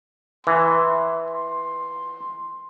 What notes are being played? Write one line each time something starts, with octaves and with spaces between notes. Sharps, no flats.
E3 C6
C6